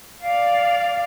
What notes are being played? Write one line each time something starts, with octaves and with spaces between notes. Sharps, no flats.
D5 F5